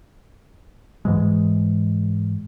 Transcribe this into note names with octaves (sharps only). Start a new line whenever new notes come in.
G#2 E3 G#3